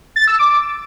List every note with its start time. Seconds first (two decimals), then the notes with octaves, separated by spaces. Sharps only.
0.16 A6
0.27 E6
0.39 D6